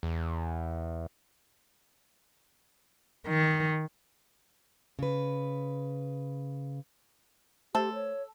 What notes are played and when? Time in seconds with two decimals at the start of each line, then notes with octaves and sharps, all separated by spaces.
0.03 E2
3.28 D#3
4.99 C#3 B4
7.75 A3 G4 A4 C5
7.94 C#5